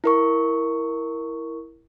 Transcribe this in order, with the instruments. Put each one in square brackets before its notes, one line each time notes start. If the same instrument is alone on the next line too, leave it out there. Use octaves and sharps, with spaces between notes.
[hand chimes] E4 A#4 C#6